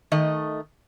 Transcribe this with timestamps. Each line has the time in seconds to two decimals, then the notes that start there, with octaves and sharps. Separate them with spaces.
0.12 D#3 A3 D#5